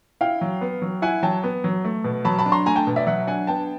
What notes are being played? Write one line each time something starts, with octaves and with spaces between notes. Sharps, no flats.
E4 F5 G5
F#3
B3
F#3
E4 F#5 G#5
F#3 G5 A5
B3
F#3
A3
B2
F#3 A5 B5
A5 B5
D4
A#5 C6
A3 G#5 A#5
G5 A5
B2
D5 E5
F#3 E5 F#5
D4 F#5 G#5
B3 G5 A5